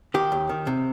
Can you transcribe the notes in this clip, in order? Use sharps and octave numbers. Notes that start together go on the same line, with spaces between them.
D#3 G4
D#2
D#3
C3